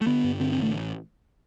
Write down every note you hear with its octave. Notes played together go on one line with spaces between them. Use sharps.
A3
D3 B3
G2
D3 C4
C4
A1
A3